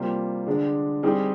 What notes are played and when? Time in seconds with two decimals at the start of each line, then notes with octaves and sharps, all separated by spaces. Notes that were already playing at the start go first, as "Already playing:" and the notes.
Already playing: C3 G3 A#3 F4 C5
0.47 D3 G#3 D4
1.03 G3 C4 D#4 G#4